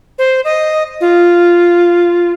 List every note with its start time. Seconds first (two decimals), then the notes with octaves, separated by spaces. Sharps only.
0.19 C5
0.45 D#5
1.01 F4